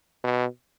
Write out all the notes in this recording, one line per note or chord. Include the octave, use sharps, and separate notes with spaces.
B2